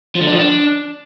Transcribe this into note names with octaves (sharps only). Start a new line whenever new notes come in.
F3
D3
D4
F3
D4